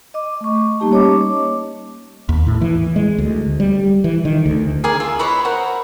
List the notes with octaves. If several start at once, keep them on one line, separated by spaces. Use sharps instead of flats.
D#5 D6
A3 C#6
G3 A#3 D#4 G4 A5
C#4 C#5 D#5 D6
D#2
A2
E3
G#3
D2
G3
E3
D#3
D2
G#4 A#4 D5 G#5
F4 E5
E4 B4 C#5 D#5
F#4 A#4 C5 F#5